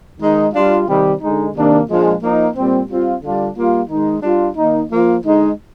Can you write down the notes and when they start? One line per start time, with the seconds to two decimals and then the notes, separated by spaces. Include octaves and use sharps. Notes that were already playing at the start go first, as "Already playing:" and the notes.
0.20 D#3 G#3 D#4
0.54 G3 D4 F4
0.88 C3 D#3 G3
1.21 D3 G#3 D#4
1.55 C3 D#3 A#3 D4
1.88 A#2 F3 G#3 D4 F4
2.22 F3 A#3 D#4
2.56 A#2 G3 C4
2.89 G3 C4 F4
3.23 D3 G3 D4 F4
3.56 G3 A#3 F4
3.89 D#3 G#3 D#4
4.23 G3 D4 F4
4.57 D#3 A#3 D#4
4.90 F3 A#3 F4
5.24 D3 G#3 D#4